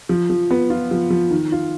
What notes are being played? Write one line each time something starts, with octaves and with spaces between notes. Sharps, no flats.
F3
F3
B3
F4
F3
F3
D#3
F4